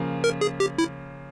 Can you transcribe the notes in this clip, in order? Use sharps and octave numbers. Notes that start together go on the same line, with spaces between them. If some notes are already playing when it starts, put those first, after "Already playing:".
Already playing: C#3 F3 A#3
A#4
G#4
G4
E4